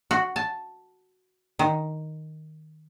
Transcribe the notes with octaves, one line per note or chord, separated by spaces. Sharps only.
F#4
A5
D#3